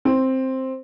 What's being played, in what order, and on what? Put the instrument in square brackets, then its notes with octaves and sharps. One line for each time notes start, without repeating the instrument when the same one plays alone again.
[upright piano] C4